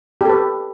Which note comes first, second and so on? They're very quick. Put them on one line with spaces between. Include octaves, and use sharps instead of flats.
G4 A4 B4